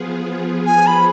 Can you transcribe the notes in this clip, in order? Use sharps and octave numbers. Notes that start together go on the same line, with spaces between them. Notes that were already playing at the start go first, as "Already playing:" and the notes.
Already playing: F3 B3 F4 G#4
G#5
B5